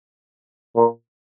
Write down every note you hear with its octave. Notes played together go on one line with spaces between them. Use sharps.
A#2